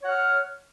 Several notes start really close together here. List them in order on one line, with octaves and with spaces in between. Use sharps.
C#5 F#5 F6